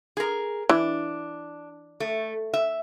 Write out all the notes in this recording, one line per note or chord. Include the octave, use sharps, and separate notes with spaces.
G#4 A#4
E3 D4
A3
E5